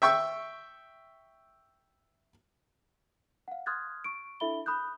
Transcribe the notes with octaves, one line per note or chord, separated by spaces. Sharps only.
E5 G5 C#6 E6
F5 F#5
C6 D#6 F6 F#6 G#6 A6
C#6 D7
D4 E4 A4 E5 B5 G7
B5 D#6 F#6 G6